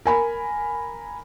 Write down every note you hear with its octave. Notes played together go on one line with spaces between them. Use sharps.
A#4 G#5 B5